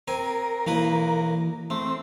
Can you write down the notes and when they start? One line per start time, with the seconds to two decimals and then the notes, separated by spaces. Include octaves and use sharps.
0.08 C4 A#4 G#5
0.67 B1 E3 A#3 B4
1.70 A3 C4